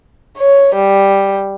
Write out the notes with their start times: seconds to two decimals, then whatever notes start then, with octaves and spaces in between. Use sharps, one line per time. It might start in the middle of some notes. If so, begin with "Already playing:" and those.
0.37 C#5
0.75 G3